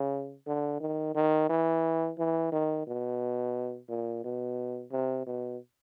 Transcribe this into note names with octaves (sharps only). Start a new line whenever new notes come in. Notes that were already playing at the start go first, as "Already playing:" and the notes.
Already playing: C#3
D3
D#3
D#3
E3
E3
D#3
B2
A#2
B2
C3
B2